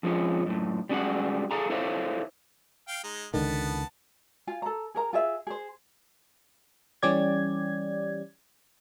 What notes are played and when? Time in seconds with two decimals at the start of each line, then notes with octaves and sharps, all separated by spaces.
0.03 F2 F3 G#3 C#4
0.46 F#2 A2
0.89 G3 G#3 C#4 F#4 G#4 F#5
1.51 G#4 A4 F5 G#5 A#5
1.70 E4 A4 C5 C#5 E5 F5
2.88 F5 G5
3.04 G#3 D#4
3.34 C#2 D3 D#3 B3 A5
4.47 F4 F5 G#5
4.62 A4 A#5
4.95 G#4 A#4 A#5
5.13 F4 G#4 E5
5.47 G#4 C5
7.02 E3 G3 C#4 G4 D5 G#6